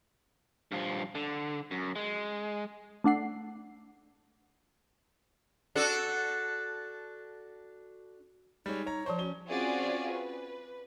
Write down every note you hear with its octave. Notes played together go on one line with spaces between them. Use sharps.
G2 F3
D3
F#2
G#3
A3 D4 F#5 C7
D4 F#4 A4
G3 G#3 D#4 C#5
C#5 A#5
F3 C5 C#5 A5 C#6
C#4 F#4 G7
C4 C#4 F4 F#4 G#4 D5
B4